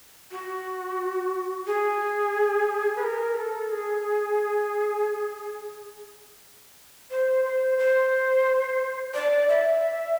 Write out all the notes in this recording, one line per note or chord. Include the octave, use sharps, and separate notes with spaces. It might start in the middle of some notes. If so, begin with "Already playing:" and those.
F#4
G#4
B4
A#4
A4
G#4
C5
C5
C5
D5
E5